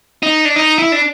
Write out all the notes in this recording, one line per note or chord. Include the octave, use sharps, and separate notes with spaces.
D#4
D4
D#4
E4
D4